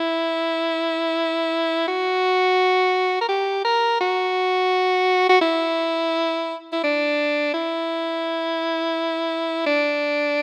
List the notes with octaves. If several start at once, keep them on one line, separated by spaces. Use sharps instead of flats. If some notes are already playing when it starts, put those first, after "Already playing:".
Already playing: E4
F#4
A#4
G4
A#4
F#4
F#4
E4
E4
D4
E4
D4